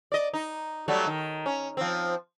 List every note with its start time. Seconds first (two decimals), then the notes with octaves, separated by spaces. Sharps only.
0.12 D5 D#5
0.34 D#4
0.88 F#3 G3 A3
1.07 D#3
1.46 C#4
1.77 F3 C4